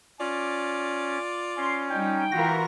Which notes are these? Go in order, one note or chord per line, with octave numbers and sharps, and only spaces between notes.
C#4 F4 D5
C#4 C6
G3 D#4 G5
E3 F4 F#4 A#4 A#6